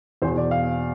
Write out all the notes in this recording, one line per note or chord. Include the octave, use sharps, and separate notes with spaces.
E2 B2 C5
D5
F5